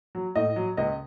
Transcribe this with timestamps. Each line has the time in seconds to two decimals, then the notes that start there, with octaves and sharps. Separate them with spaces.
0.15 F#3
0.35 A2 D#5
0.56 F#3
0.77 C#2 D#5